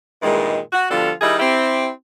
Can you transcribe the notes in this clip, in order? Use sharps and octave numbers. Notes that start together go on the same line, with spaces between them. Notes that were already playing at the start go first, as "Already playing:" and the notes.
G2 A#2 D#3 E3 G#3
F#4
B2 D3 F3 G3 F4 A4
D#3 G3 E4 G#4 D#5
C4 E4 G4